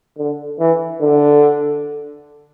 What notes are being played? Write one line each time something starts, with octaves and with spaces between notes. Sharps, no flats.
D3
E3
D3